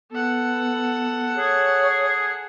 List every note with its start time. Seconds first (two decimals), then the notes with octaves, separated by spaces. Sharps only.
0.11 B3 A4 F#5
1.36 G#4 C#5